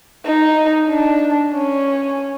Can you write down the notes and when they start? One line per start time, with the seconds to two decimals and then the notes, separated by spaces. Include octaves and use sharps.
0.26 D#4
0.90 D4
1.54 C#4